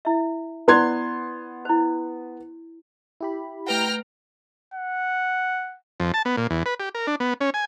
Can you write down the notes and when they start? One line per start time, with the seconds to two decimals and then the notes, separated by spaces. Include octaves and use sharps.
0.05 E4 E5
0.68 B3 E4 C5 D5 C6 G#6
1.65 E4 C5
3.21 E4 G4 B5
3.67 A3 B4 F#5 G5 A#5 F6
4.74 F#5
6.00 F2
6.14 A5
6.25 B3
6.37 A#2
6.50 E2
6.66 B4
6.80 G4
6.95 A#4
7.07 D4
7.20 B3
7.41 C#4
7.54 G#5